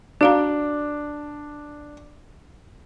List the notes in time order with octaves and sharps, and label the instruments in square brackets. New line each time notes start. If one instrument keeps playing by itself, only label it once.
[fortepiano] D4 [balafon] F#4 F5 A#5